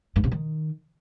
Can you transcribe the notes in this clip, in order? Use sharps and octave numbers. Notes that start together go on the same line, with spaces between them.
G2
C3
D#3